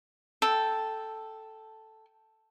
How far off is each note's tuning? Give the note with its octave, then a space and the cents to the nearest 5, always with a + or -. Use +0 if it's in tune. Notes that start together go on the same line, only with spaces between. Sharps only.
A4 +0 G5 +0